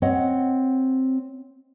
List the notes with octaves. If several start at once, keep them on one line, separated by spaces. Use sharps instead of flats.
C4 C#5 D#5 F#5